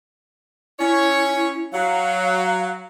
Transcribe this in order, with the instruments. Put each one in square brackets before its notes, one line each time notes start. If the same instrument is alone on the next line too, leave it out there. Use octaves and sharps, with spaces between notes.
[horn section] C#4 C#5 [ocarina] E4
[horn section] F#3 [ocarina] F5